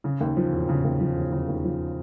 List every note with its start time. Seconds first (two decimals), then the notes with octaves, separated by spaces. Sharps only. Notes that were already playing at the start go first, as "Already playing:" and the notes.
0.04 C#3
0.20 D#2
0.37 F3
0.52 E1
0.69 C#3
0.84 D#2
1.00 F3
1.16 E1
1.32 C#3
1.48 D#2
1.64 F3